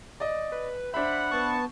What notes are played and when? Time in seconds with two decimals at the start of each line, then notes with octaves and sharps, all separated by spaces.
0.20 D5 D#5
0.52 B4
0.94 D4 C5 E5 F#5 B5
1.31 B3 A5 C#6